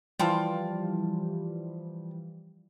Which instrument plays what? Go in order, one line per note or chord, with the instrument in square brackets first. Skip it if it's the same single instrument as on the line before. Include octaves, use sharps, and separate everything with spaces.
[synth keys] E3 F3 G3 [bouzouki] F4 G5 A5